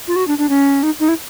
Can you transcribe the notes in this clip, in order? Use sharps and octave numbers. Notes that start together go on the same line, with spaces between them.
F4
F#4
D4
D4
C#4
D#4
D#4
E4